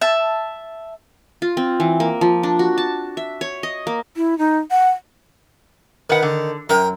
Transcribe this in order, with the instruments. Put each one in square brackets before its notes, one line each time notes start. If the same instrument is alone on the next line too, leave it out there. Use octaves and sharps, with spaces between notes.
[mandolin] E5 A5
[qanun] F4
C4
E3
A#3
F3
D4
F#4
A5
E5
C#5
D#5
A#3
[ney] E4
D#4
F#5
[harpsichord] D#3 [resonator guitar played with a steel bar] B4 F#5
[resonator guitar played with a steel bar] D3
[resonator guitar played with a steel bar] F#2 [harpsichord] A#4 G5